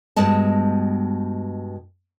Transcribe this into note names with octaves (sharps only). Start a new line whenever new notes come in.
G2 B2 G#3 D#5 A5